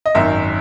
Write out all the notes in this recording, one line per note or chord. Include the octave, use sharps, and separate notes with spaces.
D#5
G#1 F#2 D#3 E5